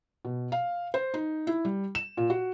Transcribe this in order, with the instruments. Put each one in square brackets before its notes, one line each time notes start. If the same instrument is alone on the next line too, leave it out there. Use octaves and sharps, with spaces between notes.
[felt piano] B2
F5
C5
D#4
E4
G3
E7
A#2
F#4